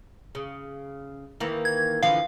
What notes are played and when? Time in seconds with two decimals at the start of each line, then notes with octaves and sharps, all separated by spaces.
0.35 C#3
1.40 D#3 E3 A#3
1.65 G#6
2.03 D3 E3 F3 F5